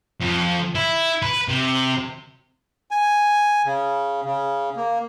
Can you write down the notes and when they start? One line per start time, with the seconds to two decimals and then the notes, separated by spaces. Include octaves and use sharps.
0.21 F2
0.75 E4
1.22 B4
1.48 C3
2.91 G#5
3.65 C#3
4.25 C#3
4.76 A#3